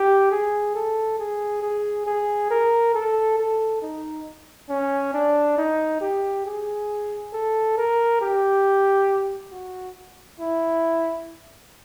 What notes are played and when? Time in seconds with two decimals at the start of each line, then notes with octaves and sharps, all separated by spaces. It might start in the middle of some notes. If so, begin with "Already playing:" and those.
Already playing: G4
0.31 G#4
0.75 A4
1.19 G#4
1.63 G#4
2.06 G#4
2.50 A#4
2.94 A4
3.38 A4
3.82 D#4
4.69 C#4
5.14 D4
5.57 D#4
6.01 G4
6.46 G#4
7.33 A4
7.77 A#4
8.21 G4
9.52 F#4
10.40 E4